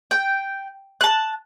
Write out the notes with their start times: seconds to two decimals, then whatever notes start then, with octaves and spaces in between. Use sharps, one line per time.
0.11 G5
1.01 A5 F#6